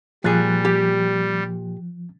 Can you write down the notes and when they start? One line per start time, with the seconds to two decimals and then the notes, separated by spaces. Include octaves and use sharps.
0.24 A#2 F3 G3 G#4 F#6 A6
0.65 G4